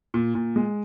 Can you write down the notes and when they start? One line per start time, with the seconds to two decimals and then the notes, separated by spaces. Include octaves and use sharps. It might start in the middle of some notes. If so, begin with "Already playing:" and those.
0.14 A#2
0.35 A#2
0.56 G#3